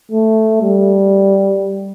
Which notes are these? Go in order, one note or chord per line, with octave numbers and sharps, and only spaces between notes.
A3
G3